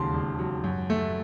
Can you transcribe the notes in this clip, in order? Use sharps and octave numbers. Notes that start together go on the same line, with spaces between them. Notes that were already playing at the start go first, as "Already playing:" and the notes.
Already playing: E1 D#2 C#3 F#3 A5 C6
E1
F#3
F#2
A3